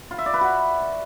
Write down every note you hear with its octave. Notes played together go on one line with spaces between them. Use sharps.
F4
E5
D5
B4
F#4